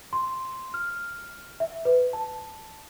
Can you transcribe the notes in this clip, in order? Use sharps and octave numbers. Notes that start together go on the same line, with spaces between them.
C6
F6
E5
B4
A5